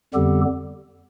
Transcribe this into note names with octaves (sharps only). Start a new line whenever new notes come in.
F2 D3 G3 B3 G4 A4